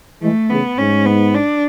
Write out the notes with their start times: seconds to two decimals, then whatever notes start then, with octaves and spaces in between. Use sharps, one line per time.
0.21 E3 G#3 A3
0.50 C#3 E3 B3
0.78 G#2 C#4
1.06 B3
1.35 D4